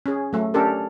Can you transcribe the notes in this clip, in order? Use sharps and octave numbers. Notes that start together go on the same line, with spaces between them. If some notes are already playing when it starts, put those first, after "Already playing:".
C#4 G#4
F#3 A3
C#4 D4 G4 A4 A#4